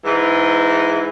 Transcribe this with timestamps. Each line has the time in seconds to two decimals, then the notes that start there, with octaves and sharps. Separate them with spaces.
0.04 G#2 E3